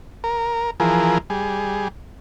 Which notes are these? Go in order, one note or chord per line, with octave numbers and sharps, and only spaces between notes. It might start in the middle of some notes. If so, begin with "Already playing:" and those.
A#4
E3 F3 G#4 A#4
G3 G#4